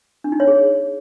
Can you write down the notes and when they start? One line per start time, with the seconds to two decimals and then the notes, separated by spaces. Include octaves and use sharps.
0.24 D4
0.32 D#4
0.40 C#5
0.48 G#4